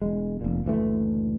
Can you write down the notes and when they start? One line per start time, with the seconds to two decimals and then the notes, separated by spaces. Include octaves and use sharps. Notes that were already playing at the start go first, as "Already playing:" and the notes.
0.02 E1 G#3
0.41 F1 A#2
0.65 F#1 D2 E3 A3